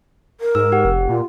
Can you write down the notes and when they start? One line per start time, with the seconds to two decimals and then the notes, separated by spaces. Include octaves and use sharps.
0.41 A#4
0.55 G#2 E6
0.72 G4 F#5
0.85 F1
1.09 A#2 F4